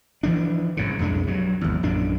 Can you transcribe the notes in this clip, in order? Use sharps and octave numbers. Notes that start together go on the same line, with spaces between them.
E3 F3 D4
C2 G#2 C#3
B1 F2 G#3 D4
G2 F#3
G#1 E2
A#1 F#2 D4